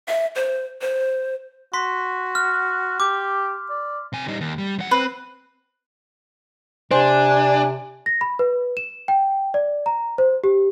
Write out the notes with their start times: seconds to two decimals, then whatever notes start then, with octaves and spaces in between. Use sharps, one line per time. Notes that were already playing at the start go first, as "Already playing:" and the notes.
0.08 E5
0.35 C5
0.81 C5
1.74 F#4 C6 B6
2.35 F6
3.00 G4 D6
3.70 D5
4.13 C3 G#5
4.28 G3 D#4
4.41 D#2
4.58 G3
4.78 F2 F#5
4.91 C4 B4
6.91 C3 D4 C5 G#5
8.06 A#6
8.21 B5
8.39 B4
8.77 E7
9.08 G5
9.54 D5
9.86 A#5
10.18 C5
10.44 G4